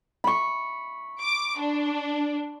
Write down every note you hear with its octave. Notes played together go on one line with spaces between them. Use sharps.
B5 C#6
D6
D4